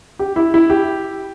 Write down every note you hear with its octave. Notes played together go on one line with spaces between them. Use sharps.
G4
E4
E4
G4